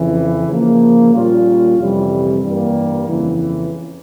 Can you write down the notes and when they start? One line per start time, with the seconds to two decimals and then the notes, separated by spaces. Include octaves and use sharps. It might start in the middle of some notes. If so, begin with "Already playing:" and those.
Already playing: F2 C#3 E3
0.49 C#3 F3 A#3
1.14 A#2 G3 C#4 F4
1.79 F2 C3 E3 G3
2.44 G2 E3 G3 A#3
3.08 F2 C#3 E3